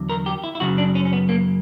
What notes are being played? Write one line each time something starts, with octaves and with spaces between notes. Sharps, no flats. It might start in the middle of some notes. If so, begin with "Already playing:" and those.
Already playing: E2 D3 F#3
A#4
G4
E4
E4
F#2 C#3 F#3 F#4
D4
C#4
C#4
B3
A#3